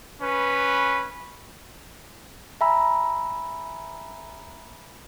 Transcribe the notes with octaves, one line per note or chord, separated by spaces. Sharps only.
C#4 B4
E5 G#5 A#5 B5 E6